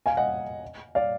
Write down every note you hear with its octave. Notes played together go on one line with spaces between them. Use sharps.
F5 G#5
D#5 F#5
D5 F5